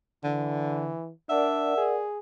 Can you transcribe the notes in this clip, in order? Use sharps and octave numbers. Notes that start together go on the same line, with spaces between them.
D3 E3
D4 A#4 D5 E5 F#5
G#4